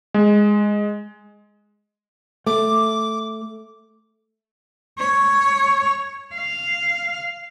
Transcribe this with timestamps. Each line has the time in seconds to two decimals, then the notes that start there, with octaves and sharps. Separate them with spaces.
0.14 G#3
2.47 A3 D6
4.99 C#5
6.35 F5